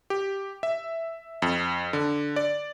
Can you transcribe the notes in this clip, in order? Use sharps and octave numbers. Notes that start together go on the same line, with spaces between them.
G4
E5
F2
D3
D5